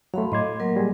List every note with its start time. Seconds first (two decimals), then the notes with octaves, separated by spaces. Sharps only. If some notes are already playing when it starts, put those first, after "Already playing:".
0.14 F#3 A3 F5 B5 C6
0.32 A2 D#5 C6 D6 G#6
0.60 F#3 A#3 A#4
0.76 G3 G#4